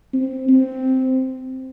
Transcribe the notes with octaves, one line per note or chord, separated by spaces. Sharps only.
C4
C4